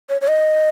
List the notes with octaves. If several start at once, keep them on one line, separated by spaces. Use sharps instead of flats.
C#5
C#5
D#5